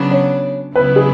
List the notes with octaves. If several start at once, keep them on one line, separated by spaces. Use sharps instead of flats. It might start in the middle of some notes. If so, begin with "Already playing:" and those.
Already playing: C#3 F#3 B3 D4
C#5
C#2 C#3 F#3 B3 E4 B4
G#4